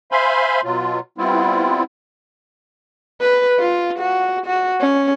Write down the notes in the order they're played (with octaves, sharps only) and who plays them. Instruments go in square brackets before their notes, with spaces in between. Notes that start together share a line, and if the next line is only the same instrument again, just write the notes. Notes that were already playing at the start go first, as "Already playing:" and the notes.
[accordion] C5 E5 F5 G#5 B5 C6
B2 F#3 F4
G3 B3 C4 E4 F4
[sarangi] B4
F4
F#4
F#4
C#4